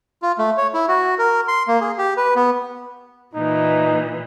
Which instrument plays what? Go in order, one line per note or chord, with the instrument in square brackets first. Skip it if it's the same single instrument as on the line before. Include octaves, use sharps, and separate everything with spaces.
[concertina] F4
A3
C#5
E4
F#4
A#4
C6
A#3
G#4
G4
B4
B3
[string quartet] A#2 E3 [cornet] D#4